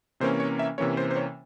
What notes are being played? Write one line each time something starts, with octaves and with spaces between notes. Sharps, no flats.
C3 E3 A#3 C#4 C5
C#5
E5
C3 E3 A#3 C#4 C#5
C5
C5
C#5